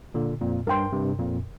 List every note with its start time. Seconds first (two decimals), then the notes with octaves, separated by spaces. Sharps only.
0.14 A#2 D3
0.41 F2 A#2
0.67 G2 A#4 G5 C6
0.92 G2 C3
1.19 F2 A#2